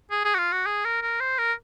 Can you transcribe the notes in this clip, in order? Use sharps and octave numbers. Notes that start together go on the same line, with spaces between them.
G#4
G#4
F#4
F4
F#4
G#4
A#4
A#4
C5
A#4